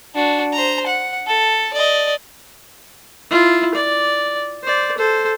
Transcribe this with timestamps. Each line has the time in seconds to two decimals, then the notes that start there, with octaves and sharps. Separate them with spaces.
0.15 D4 F#4
0.53 C5 A#5
0.87 F#5
1.27 A4
1.73 D5 D#5
3.31 E4 F4
3.75 D5
4.64 C5 D5
4.97 A4 C5